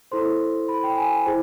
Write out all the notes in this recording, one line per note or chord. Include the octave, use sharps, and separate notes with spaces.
E4 A4 C5 C6
B5
G5
G#5
E4 G#4 C5